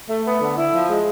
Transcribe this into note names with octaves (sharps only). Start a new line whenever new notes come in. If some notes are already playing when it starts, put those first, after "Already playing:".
A3
B3
D3
E4
F3
G#3